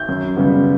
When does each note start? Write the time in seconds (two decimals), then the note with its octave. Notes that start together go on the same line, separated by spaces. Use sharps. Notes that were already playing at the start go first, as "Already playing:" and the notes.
Already playing: G6
0.09 F#2
0.36 C#3 G3 B3